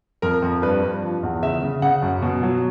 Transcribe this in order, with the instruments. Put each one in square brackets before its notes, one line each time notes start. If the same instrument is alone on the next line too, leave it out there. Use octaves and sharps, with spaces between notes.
[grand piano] F2 A#4
F2
G2 B4
G2
F3
E2
C#3 E5
C#3
C#3 F#5
F#2
B2
F#3